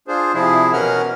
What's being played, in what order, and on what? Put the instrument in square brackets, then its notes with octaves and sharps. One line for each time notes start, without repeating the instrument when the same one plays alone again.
[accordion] D4 F4 G#4 C5
C3 F3 E4 G#4
B2 E3 C#4 A#4 F#5 F6